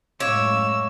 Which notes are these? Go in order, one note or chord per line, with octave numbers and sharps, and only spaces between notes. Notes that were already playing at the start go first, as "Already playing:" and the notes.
F#2 A2 G#3 C#5 F5 D6 E6 D7